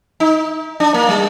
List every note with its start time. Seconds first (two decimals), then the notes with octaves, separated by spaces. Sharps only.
0.20 D#4
0.80 D4
0.94 A#3
1.09 G3